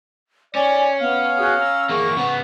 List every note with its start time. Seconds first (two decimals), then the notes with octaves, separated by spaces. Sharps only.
0.55 C#4 D5 G#5
1.01 B3 F5
1.38 F#4 G#4 D#6
1.60 A#5 E6
1.89 E2 A#3 G#4 C#6
2.17 C#3 B3 F#5